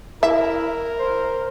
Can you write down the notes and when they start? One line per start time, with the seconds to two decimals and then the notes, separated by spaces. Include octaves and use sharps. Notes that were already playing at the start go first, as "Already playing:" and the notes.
0.23 E4 A#4 E5
0.99 C5